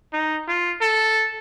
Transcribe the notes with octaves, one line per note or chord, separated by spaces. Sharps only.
D#4
F4
A4